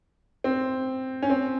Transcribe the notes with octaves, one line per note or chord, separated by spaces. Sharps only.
C4
C#4
C4